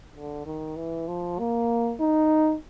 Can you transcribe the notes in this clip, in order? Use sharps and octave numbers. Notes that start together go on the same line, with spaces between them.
D3
D#3
E3
F3
A#3
D#4